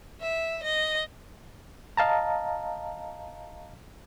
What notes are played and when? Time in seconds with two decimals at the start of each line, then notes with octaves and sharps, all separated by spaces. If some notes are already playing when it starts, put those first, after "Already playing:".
0.21 E5
0.63 D#5
1.97 D#5 F5 A5 A#5